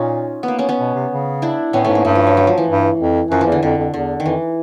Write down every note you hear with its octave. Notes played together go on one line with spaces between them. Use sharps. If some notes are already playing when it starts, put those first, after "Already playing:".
Already playing: A#2 C#4 D#4 F4
B3
A#3
B3 C#4
B3 C#4
B2
C3
C#3
D4 E4
A2 B3 C#4
G#2 A3 B3
A#3
G2 A3
F3
F#3
F#3
F3
E3
G2
F2
F#2 F3
E3
E2
D3
F2 D3
F2
E2 D3
D#3
F2 E3